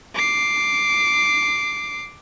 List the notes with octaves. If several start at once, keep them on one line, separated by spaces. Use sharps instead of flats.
D6 C7